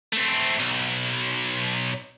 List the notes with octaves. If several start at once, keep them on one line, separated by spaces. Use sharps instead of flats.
A3 C4
B1